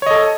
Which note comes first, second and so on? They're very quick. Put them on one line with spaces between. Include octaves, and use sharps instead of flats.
C#5 D#5 A4